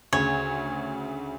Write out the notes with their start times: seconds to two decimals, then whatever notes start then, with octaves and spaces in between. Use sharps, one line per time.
0.13 D2 C#3 C#5